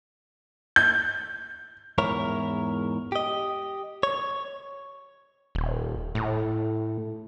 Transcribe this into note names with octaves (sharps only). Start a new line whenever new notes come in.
G6
E2 G#2 E4 A#4 C#5
G4 D#5
C#5
D#1
A2